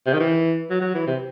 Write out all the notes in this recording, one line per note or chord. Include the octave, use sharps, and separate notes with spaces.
C3
D#3
E3
F#3
F#3
E3
C3